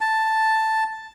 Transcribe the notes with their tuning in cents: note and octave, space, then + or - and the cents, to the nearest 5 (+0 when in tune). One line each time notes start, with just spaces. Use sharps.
A5 +5